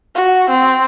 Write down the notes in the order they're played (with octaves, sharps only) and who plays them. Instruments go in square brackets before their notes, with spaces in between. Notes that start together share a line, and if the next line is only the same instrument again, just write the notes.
[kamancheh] F#4
C4